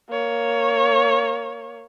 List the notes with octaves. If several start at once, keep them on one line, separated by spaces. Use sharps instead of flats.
A#3 C#5